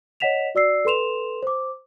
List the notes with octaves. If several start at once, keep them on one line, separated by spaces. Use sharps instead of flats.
C#5 D#5 F#5 B6 E7 F7
F#4 D5 E6 C7
A4 B4 C6 E7 F7
C5 D6